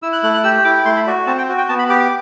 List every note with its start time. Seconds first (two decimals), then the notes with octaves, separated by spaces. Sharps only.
0.03 E4 E6
0.13 F#6
0.23 A3 F#6
0.34 F#6
0.44 G4 E6
0.64 E4 D6
0.85 A3 C6
0.96 B5
1.07 F#4 D5
1.27 C4 A5
1.38 G5
1.49 F#4
1.58 G5
1.69 B3 A5
1.79 B5
1.89 G4 D6
2.00 D6